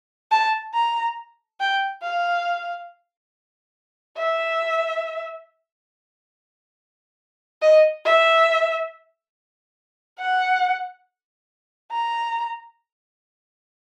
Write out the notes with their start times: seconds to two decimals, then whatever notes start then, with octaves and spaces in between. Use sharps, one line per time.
0.31 A5
0.74 A#5
1.60 G5
2.03 F5
4.18 E5
7.62 D#5
8.05 E5
10.20 F#5
11.92 A#5